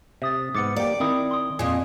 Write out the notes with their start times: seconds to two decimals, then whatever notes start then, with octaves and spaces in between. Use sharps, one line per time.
0.22 C3 E5 D#6 A6
0.55 G#2 B3 D6 A6 C#7
0.76 A#3 G4 D5
1.00 D#3 C4 E4 A#4 D#6
1.31 C6 D#6
1.59 F2 A#2 G#4